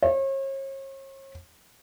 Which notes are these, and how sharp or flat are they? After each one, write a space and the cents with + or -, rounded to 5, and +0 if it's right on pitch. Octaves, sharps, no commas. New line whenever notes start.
C#5 -40